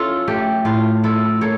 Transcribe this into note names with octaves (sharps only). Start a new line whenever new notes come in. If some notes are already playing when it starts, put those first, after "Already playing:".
Already playing: C#4 E4 F4 A4
A3 G4
A2 F4
E4 F4 A4
A#3 A4 C#5